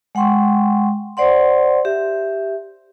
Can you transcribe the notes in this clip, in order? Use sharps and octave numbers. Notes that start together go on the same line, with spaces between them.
G#3 F#5 G5 C6 C#6
C5 D5 F#5 C6
G4 E5